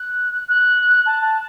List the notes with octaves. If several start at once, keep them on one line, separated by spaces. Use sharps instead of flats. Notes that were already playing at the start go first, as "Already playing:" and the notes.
Already playing: F#6
F#6
A5